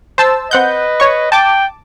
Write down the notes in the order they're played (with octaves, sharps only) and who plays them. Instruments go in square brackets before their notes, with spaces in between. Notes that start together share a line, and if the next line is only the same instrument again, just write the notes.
[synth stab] C5 A5 E6
[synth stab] C4 F#5 G6 [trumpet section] B4 D#5
[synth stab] C#5 C#6
[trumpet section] G5 [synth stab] A5 D6